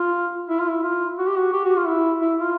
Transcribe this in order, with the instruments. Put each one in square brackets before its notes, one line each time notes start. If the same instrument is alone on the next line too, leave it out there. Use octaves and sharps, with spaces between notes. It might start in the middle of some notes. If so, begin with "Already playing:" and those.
Already playing: [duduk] F4
E4
F4
E4
F4
F#4
G4
F#4
G4
F#4
F4
E4
E4
F4